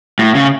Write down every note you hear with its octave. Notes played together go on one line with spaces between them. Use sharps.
A2
C#3